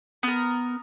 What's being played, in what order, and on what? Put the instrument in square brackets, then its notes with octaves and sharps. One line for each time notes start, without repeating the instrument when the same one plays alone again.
[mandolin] B3 A#4